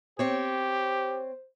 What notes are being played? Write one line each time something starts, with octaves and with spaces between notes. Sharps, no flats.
C4 G4 C5 C#5